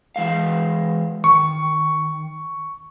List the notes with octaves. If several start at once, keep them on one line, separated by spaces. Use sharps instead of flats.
E3 G#3 F5
D#3 C#6